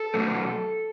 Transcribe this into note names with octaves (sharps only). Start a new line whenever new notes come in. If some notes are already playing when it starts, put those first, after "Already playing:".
Already playing: A4
B2 F#3 A3